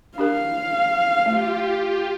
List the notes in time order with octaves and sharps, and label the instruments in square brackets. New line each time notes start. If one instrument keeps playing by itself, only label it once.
[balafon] D4 G4 A#4 [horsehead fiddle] F5
[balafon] A3 [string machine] F4 G4